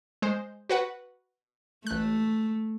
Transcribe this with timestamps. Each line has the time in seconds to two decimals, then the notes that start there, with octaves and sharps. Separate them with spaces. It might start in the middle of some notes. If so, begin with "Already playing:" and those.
0.22 G#3 C5
0.69 F#4 B4 F#5
1.87 A1 A3 F#6